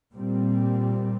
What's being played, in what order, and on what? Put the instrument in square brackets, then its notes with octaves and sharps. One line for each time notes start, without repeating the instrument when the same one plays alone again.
[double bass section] A#2 G3 C4